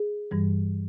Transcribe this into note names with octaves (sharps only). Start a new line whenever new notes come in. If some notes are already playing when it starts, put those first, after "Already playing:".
Already playing: G#4
G2 E3 G3